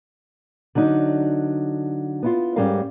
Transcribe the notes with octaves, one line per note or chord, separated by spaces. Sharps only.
D3 F#3 D4 D#4
B3 E4 F4
G#2 G3 C#4 A4 A#4 F5